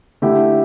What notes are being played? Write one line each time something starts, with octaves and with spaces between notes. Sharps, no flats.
D3 A3 E4 G4